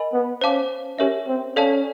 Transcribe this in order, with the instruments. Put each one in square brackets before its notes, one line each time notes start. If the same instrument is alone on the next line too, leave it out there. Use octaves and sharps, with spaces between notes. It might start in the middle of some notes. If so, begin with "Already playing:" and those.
Already playing: [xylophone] A#4 D#5 G#5 B5
[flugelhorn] B3
[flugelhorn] C#4 [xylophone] C5 F5 A5 D6
[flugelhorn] C#4 [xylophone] G4 A#4 C#5 E5
[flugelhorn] C4
[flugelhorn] C#4 [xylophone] A4 D5 F5 A5